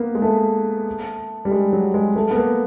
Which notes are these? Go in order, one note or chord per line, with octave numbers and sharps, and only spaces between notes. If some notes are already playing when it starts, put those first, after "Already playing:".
Already playing: A#3 B3
G#3
A3
G3
G#3
F#3
G#3
A3
B3
A#3